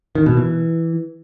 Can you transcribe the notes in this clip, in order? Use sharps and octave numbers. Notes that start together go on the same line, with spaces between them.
D#3
B2
E3